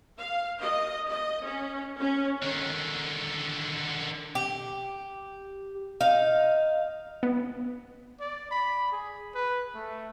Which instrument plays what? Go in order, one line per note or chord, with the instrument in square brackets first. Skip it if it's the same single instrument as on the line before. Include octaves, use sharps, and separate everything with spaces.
[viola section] F5
D#5
D#5
C#4
C#4
[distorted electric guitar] D3 D#3
[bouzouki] G4
D#4 F5
[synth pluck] B3
[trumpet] D5
B5
G#4
B4
A3